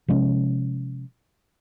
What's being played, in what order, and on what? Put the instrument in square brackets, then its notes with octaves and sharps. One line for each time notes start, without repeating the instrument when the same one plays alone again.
[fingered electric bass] C3 F3 G#3 C#4